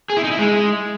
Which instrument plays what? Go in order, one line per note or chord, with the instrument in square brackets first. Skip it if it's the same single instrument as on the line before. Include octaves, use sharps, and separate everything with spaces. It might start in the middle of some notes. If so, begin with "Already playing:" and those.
[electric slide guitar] G#4
E4
D#4
E4
G#3